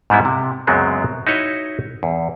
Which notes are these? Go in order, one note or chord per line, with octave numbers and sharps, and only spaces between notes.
G#2 G3 B3 E4
C3
C#2 F#2 F#3 G#3 B3 C4
D#4 E4 F#4 B4 C#5 D#5
E2